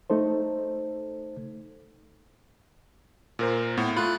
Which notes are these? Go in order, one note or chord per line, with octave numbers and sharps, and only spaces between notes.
A3 D#4 A4 C5
A#2 A#4 C5
A2 B3
A3 F4 B5 F#6